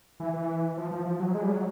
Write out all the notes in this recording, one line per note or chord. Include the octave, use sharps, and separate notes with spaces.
E3
E3
F3
F3
F3
F#3
G#3
G3
F#3